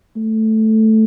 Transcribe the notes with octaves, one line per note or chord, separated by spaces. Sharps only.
A3